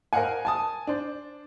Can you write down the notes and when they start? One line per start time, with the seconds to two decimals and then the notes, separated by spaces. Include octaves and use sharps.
0.13 A#4 C5 D#5 F5 F#5 G#5
0.45 G#5 A5 D#6
0.87 D4 C5